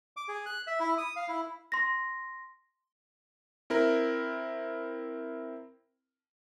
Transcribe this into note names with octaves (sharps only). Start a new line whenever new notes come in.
D6
G#4
F#6
E5
E4
D#6
F5
E4
C6 A#6
C4 E4 A#4